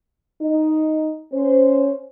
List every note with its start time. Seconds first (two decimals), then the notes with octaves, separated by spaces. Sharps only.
0.42 D#4
1.33 C#4 C5